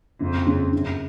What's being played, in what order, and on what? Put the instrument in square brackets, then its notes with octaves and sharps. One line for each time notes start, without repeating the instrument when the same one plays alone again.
[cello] F2 [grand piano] C#3
[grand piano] C#3
[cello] F#2 [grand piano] C#3